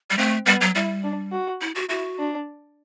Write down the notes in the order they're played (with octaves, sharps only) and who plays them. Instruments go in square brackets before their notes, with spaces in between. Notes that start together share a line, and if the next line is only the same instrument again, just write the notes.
[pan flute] G3
[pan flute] A3 [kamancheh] C4
[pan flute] G3 [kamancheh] B3
[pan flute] F#3
[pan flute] G3 [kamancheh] E4
[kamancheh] D4
F#4
[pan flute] E4
F#4
[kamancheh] E4 [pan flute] F#4
[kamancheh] D4